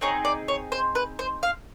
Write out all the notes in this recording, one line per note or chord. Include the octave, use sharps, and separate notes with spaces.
C4 D#4 G#4 C#5
D5
C#5
C5
B4
C5
F5